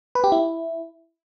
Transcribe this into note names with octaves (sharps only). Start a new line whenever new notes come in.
B4
G4
E4